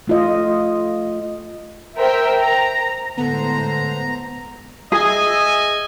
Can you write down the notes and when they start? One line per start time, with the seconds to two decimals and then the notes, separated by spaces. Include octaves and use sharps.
0.07 A3 F4 D#5
1.97 A#4 C5 E5 G5
2.40 A#5
3.18 A2 D3 G#3 B3 C5 A#5
4.92 G#4 D#5 E5 G#5